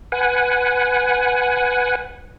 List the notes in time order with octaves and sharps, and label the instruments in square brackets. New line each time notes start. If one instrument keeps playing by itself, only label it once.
[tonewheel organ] B4 F#5 G#5